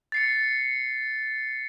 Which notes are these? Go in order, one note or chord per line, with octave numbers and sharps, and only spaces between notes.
A6 C7 C#7